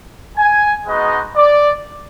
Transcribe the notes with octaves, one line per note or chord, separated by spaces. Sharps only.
G#5
G#3 B3 D#4 F#4 D#5
D5